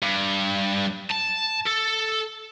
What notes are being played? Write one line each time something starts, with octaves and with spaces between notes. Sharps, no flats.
G2
A5
A4